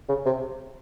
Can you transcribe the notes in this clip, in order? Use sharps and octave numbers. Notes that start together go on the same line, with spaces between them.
C#3
C3